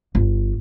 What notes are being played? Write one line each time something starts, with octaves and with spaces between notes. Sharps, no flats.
G1